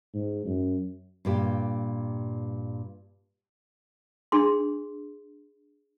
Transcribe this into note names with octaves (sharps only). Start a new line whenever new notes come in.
G#2
F#2
G2 A#2 G4
D4 G#4 C6